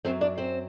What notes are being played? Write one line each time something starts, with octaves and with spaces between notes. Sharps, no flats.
F#2 F#3 C4 C5
D4 D5
C4 C5